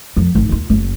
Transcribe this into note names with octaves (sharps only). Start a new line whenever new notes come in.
F2
G#1 D#3
D#2 F4
F#1